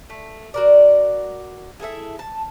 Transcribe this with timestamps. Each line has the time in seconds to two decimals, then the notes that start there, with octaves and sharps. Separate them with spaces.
0.10 A3
0.54 F#4 A#4 D5
1.80 E4 G#4 A4 E5
2.19 A5